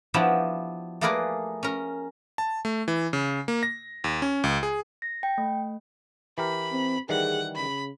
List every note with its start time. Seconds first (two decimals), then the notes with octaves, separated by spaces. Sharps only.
0.14 F3 B3 D4 E4 F#4 G4
1.01 A3 A#3 G#4 A#4 B4 D5
1.63 C#4 A#4
2.38 A5
2.65 A3
2.88 E3
3.13 C#3
3.48 A#3
3.63 A#6
4.04 D#2
4.22 C#4
4.44 C#2
4.63 G#4
5.02 A#6
5.23 G5
5.38 A3
6.38 E3 G4 A#4 B5
6.72 C4
7.09 D#3 E3 G3 G#4 F#5
7.55 C#3 B5